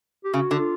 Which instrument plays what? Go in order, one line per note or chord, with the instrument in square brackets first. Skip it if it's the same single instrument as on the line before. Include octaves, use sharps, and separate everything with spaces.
[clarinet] G4
[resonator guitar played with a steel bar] C#3 [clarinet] F#4
[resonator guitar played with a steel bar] D3
[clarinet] F4